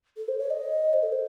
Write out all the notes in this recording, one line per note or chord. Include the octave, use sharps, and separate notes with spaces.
A4
C5
C#5
D#5
C5
A4
C5